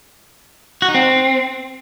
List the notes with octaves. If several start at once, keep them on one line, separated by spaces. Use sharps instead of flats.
F#4
D#4
C4